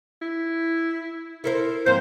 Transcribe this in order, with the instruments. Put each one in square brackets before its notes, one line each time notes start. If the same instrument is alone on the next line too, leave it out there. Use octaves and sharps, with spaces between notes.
[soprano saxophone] E4
[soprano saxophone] E4 [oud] A4 A#4 C5
[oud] F2 G#2 [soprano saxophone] A#3 [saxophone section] C5